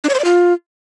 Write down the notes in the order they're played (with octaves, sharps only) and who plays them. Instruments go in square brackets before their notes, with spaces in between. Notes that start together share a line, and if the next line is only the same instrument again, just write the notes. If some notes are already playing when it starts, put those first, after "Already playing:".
[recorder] D4
C#5
C5
D5
F4